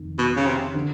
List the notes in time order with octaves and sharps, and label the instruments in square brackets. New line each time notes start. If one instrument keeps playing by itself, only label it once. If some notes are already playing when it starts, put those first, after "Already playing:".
Already playing: [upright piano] F1 D#3
[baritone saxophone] B2
C#3
C3
[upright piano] D3